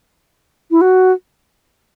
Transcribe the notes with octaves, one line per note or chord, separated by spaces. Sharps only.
E4
F#4